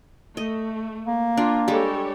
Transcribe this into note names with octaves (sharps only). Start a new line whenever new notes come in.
A3 D#5
A#3
D4 F4
G3 G#3 G4 A4 C#5